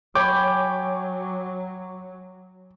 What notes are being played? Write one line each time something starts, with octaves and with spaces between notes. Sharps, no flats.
F#3 C#5 G5 G#5 B5 C#6 D6